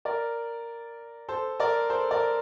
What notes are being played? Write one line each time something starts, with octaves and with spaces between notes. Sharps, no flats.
A#4 D5
A4 C5
A#4 D5
A4 C5
A#4 D5